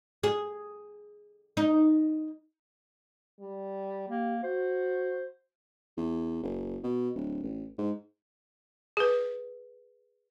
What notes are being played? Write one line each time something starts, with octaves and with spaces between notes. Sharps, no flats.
G#4
D#4
G3
A#3 G4
F#4 C5
E2
F#1
B2
D1
A1
G#2
G#4 B4